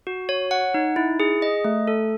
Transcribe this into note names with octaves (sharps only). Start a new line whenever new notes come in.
F#4
C#5
F#5
D#4
E4
G#4
D#5
A3
A4